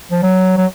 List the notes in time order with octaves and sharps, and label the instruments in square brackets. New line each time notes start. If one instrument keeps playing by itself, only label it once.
[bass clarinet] F3
F#3
F#3